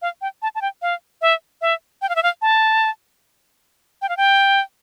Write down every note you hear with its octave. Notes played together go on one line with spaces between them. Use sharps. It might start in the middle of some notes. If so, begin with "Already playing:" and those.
F5
G5
A5
A5
G5
F5
E5
E5
G5
F5
E5
F5
A5
G5
F5
G5